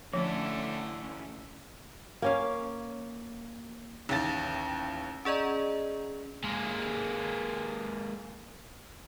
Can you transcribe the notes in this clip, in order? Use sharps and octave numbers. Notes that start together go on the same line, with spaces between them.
A2 D3 F3 A3 C#4 E4
A#3 C#4 F5
A1 D#2 A6
C#4 G#4 D5 D#5 A#5
G#3 A#3